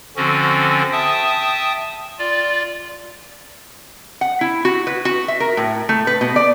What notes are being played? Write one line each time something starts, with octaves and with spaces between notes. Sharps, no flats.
D3 F3 C4 C#4 F#4
E5 G5 A5 D#6
F4 D5
F#5
E4
F#4
B4
F#4
E5
A#4
A2
A3
B4
B2
D5